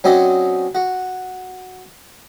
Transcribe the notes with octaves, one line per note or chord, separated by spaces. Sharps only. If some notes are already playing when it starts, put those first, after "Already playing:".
F#3 C4 C#4 D5 D#5
F#4